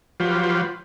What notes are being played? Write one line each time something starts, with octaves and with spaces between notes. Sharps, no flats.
F3 F#3 F4 G4 B4 C5